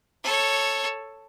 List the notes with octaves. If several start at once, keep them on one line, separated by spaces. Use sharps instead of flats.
A4 C#5